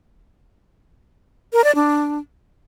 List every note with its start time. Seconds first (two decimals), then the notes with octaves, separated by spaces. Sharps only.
1.53 A#4
1.64 D5
1.75 D4